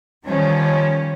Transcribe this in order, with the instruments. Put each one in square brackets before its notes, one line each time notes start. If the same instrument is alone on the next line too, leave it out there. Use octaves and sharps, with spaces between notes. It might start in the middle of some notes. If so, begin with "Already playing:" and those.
[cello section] D#3 F3 G3 C#4